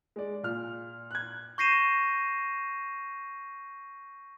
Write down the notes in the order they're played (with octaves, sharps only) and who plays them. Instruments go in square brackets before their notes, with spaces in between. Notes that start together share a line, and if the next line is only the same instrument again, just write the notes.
[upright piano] G#3 D5
A#2 F6
F#6 G#6
[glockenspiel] C#6 G6 A#6 C7 D#7 E7